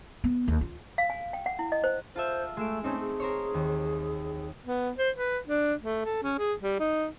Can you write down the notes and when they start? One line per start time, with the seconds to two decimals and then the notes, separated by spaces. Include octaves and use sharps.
0.24 B3
0.48 D#2
0.61 F4
0.98 F5
1.10 G#5
1.33 G5
1.46 F#5
1.59 E4
1.72 D#5
1.84 C5
2.16 F4 A4 C5 E5
2.57 G#3 A3 E6 D7
2.84 A3 C4 C#4 D#4
3.00 G#4
3.20 A#4 C5 C#5
3.54 D#2
4.65 B3
4.97 C5
5.16 B4
5.47 D4
5.83 A3
6.05 A4
6.23 C#4
6.39 G#4
6.63 G3
6.79 D#4